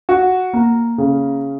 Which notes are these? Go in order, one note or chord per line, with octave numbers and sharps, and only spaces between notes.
F#4
A#3
C#3